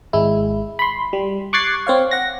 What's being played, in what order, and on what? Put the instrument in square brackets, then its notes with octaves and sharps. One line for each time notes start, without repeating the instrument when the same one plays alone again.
[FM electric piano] G#1 G#3 E4
B5 C6
G3
C#6 D6 F#6 G#6 A6 C7
C4 C#5 F5
F#5 A#6